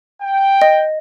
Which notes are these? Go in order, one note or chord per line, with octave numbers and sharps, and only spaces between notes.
G5
D#5